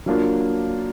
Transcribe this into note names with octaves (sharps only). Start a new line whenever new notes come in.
F#3 A#3 D4 F4